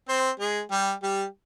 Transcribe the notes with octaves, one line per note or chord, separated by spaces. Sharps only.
C4 C5
G#3 G#4
G3 G4
G3 G4